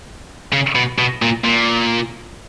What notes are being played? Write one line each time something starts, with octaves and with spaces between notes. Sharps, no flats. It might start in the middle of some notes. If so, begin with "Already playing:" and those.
C#3
B2
B2
A#2
A#2